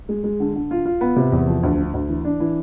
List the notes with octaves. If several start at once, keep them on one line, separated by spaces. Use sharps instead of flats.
G#3
G#3
D3
D3
F4
F4
B3
C3
E2
F3
D2
D3
D2
E3
D4
E3